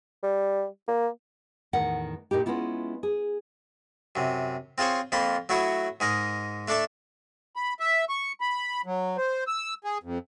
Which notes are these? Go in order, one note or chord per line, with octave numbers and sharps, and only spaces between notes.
G3
A#3
E2 A2 D#3 F#5
A#2 D#4 E4 G4
G#3 B3 C#4 E4 F4
G#4
F#2 C3
C4 F4 G#4 C5 C#5
F2 F3 A#3 B5 C6
F#3 A3 E4 F#4 C#5 D#6
G#2 G#4 A#4 D#5
A3 D4 A4 D5 E5
B5
E5
C#6
B5
F#3
C5
E6
G#4
F2